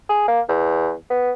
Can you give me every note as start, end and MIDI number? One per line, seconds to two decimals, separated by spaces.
0.09 0.23 68
0.28 0.41 58
0.49 0.93 40
1.10 1.33 59